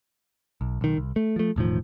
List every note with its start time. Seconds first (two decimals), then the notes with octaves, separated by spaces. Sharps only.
0.61 B1
0.81 B1 D#3
0.97 C2
1.16 A3
1.36 F3 A3
1.56 E1 A2 D#3 F3